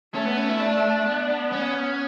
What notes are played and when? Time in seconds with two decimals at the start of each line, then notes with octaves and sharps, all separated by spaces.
0.14 A3 C#4
0.25 B3
0.37 C#4
0.49 E4
0.60 D4
1.06 B3
1.52 C#4